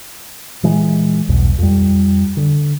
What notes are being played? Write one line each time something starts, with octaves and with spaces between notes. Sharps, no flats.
A#2 E3 G#3
B1 E2 G2 B2
F2 G3
D3